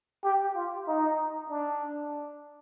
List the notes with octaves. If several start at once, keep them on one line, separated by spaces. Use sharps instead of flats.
G4
F4
D#4
D4